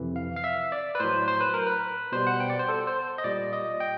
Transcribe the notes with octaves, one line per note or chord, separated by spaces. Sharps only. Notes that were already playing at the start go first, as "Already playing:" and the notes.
Already playing: F2 C3 E3
F5
F5
E5
D5
B4
A2 F#3 C5
C5
B4
A#4
B4
B2 G3 C5
F#5
G5
D5
C5
A4
C5
D#5
A#2 G3 D5
D#5
G5